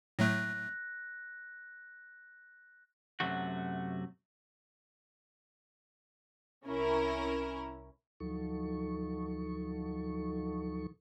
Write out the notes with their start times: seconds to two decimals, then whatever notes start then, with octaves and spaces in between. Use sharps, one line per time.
0.19 A2 F#3 A3 F#6 A#6
3.20 F#2 C3 F#3 A3 F#4
6.66 C2 C#4 E4 A#4
8.20 D2 F3 F#3 D#4 A4 C#6